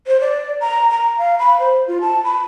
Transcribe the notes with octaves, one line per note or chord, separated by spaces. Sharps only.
C5
D5
A#5
A#5
F5
B5
C5
F4
A5
B5